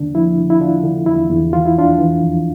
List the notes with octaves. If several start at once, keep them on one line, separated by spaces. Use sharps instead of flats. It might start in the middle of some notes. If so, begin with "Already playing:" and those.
Already playing: E2 D3 D4
F3 E4
D3
E4
D3 D4 F4
D3
E2 E4
E2
E3 F4
E4
F2 D4 F4
E3
F2